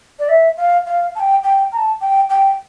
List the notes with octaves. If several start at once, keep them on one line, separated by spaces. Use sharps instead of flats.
D5
E5
F5
F5
A5
G5
G5
A#5
A5
G5
G5